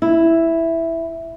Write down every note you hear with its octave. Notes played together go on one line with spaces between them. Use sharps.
E4